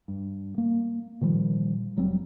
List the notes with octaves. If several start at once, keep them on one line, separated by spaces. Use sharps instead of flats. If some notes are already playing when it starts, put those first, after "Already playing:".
G2
A#3
A#2 D#3 F3 G3
F1 F#3 G3 C4